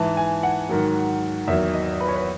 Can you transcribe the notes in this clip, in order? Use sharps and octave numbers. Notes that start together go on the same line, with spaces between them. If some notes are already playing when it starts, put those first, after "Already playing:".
Already playing: G#2 E3 A5
G#5
F#5
G#2 D#3 F#3
E2 D#3 F#3 E5
D#5
B4
C#5
B4